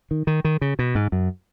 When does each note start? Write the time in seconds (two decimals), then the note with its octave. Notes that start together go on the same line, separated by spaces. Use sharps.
0.11 D#3
0.27 D#3
0.45 D#3
0.61 C#3
0.79 B2
0.95 G#2
1.12 F#2